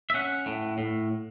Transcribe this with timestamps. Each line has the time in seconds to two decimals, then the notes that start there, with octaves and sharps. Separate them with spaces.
0.10 E5
0.14 C#4 F#5
0.46 A2
0.78 A2